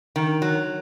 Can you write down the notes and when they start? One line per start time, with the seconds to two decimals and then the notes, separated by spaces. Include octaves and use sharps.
0.16 D#3
0.42 F#3